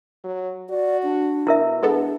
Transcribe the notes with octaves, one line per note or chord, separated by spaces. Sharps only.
F#3
F#4 D5
D4
B2 E4 A#4 E5
G#3 B3 D4 A4